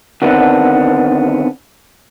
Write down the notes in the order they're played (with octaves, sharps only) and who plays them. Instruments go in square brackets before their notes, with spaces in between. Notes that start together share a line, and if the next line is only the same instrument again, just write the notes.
[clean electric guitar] D3 D#3 A3 B3 C4 D4